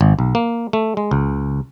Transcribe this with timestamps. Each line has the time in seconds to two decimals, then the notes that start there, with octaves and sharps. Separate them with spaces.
0.01 G#1
0.19 B1
0.35 A#3
0.73 A3
0.97 G#3
1.11 C#2